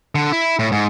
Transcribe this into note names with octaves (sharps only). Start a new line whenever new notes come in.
D3
E4
A2
G#2